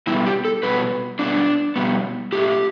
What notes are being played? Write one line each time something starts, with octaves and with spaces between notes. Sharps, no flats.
B2 G3 B3 E4
G4
A4
B2 G3 B3 B4
B2 G3 B3 D4
B2 G3 B3
A2 A3 G4